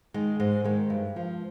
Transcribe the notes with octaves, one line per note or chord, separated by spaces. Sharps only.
D#3 G#3
G#2 G#3
D#3 G#3
G2
F3